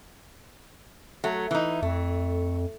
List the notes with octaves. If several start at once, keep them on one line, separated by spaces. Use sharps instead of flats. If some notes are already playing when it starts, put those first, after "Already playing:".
F#3 A3
E3 D#4
F2 A3